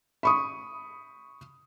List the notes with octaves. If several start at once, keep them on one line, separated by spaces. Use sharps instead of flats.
B5 C#6 D#6